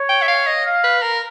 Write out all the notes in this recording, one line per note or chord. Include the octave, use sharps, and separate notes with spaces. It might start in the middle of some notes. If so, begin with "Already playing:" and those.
Already playing: C#5
G5
E5
F5
D#5
F5
B4
A#4